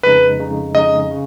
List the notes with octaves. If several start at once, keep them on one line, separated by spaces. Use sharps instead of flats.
F2 C#3 G#3 D#4 B4
F2 C#3 G#3 D#4
F2 C#3 G#3 D#4 D#5
C#3